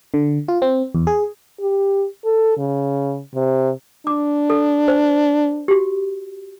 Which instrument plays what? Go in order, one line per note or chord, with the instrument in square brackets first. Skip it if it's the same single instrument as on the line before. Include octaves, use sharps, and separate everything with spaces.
[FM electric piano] D3
F4
C4
E2
G#4
[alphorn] G4
A4
C#3
C3
[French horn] D4 [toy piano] D6
[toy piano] A4
C5
F#4 G4